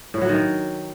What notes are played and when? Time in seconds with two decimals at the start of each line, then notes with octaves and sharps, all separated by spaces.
0.14 A2
0.21 F#3
0.29 D#3